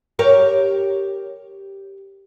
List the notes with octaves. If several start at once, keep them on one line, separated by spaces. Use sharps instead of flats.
G4 A#4 C#5